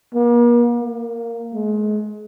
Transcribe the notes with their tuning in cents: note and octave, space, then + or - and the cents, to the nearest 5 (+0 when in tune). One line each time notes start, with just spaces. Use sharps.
A#3 +40
A#3 -10
G#3 +30